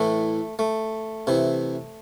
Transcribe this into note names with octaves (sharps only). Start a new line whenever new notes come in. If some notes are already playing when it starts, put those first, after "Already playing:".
Already playing: A2 E3 A3
A3
C3 E3